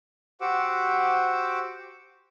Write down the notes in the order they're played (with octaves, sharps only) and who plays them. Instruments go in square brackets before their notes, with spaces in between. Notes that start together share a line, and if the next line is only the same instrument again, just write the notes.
[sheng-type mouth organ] F#4 G4 C5 F#5 D6 E6